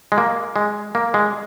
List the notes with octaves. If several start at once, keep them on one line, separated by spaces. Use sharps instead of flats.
G#3
A#3
G#3
A#3
G#3